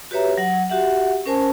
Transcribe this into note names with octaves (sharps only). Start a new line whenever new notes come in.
F#4 G4 B4 C#5 E5 A#5
F#3 F#5
F#4 G4 E5 F#5
C#4 A#4 C5 G#5 A5